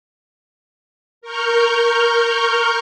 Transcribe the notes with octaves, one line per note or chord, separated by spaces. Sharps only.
A#4 C#6 F6 G6